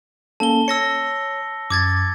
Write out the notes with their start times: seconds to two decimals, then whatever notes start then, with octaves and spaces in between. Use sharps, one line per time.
0.40 A#3 C#4 A4 A5 G7
0.68 C#5 E6 A#6 C#7
1.70 F#2 D6 G#6 A6